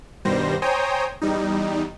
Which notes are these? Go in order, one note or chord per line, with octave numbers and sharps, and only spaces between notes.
G2 B2 D#3 G3 C5 A#6
C5 C#5 G5 G#5 A#5 D#6
E2 G3 D#4